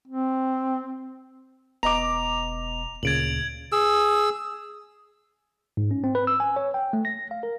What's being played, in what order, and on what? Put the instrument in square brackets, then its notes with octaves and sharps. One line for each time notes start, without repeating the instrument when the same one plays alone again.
[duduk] C4
[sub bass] E1 [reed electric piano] B3 D#5 [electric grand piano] A#5 D6 [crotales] F7
[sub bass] D2 [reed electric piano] A#2 C#3 A6 [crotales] G#6 D7 F#7
[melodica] G#4 E6
[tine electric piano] G#2
C#4
C4
B4
E6
G#5
C#5
G5
A3
A#6
F5
A#4